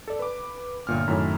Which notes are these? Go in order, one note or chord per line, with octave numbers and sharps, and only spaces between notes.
A4 D5
B4 D6
G1 A#2 F6
F#2 A2 D#3 A3 C#4 E4